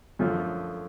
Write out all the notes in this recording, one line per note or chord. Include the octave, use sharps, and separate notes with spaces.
F#2 D3 F3 A3 F4